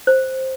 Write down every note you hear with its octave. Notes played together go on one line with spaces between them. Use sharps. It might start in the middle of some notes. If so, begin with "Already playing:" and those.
C5